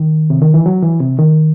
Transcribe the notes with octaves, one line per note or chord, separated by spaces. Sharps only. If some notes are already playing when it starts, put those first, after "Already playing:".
Already playing: D#3
C3
D#3
E3
F#3
E3
C3
D#3